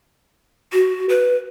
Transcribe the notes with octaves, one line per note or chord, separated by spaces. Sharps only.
F#4
B4